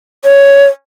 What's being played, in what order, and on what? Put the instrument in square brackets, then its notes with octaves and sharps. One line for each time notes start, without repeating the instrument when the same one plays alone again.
[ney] C#5